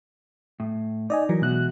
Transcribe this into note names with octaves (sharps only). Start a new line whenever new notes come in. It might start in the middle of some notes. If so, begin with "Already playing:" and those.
A2
D#4 D5 D#5 G#5
E3 F#3 A#4
B2 E3 G#3 F#4 F#6